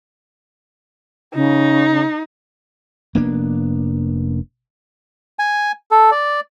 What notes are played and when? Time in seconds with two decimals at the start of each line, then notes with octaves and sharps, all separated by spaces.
1.35 C#3 D#4
3.15 F1 A#3 B3 D4
5.39 G#5
5.91 A4
6.11 D5